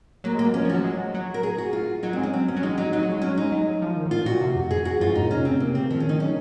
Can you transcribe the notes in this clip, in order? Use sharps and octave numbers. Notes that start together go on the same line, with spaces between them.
F#3 A#3
G#3
A#3
F#3
F3 C#4
F3
F#3 F#4
G#3
F#3
F#3
A#4
G#4
F#4
F4
F#3 D#4
C4
G#3
C#4
F#3 C4
C#4
F#3
G#3 D#4
F#3 D#4
F#3 D#4
F#3
G#3
F#3 C#4
G#3 D#4
F#3
F3
D#3
G#2
A#2 F4
A#2 F#4
C3
F2
G#4
F#4
F#2 F4
G#2
A#2 D#4
C3 C#4
C#3 C4
C3 A#3
C#3 C4
D#3 F3
C#4
D#4
F#3 C#4